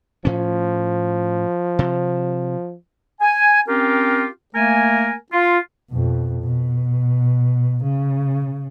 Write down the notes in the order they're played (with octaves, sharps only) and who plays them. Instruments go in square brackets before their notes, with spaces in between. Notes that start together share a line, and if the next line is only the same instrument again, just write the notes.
[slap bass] A2 C#4 [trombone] F3
[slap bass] C3
[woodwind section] G#5
C4 C#4 F4 G4 A#4
A3 A#3 A#4 G#5
F4
[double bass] F2 B2
B2
C#3